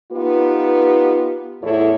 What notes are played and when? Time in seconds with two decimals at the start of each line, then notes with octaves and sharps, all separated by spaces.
0.11 B3 D#4 F4 G4 B4
1.61 E2 A2 E4 A4 C#5